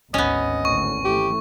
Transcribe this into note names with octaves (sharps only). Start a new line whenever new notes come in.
G#1 D2 B3 C#4 D#5
G#1 D2 A2 C#6
E3 A3 G4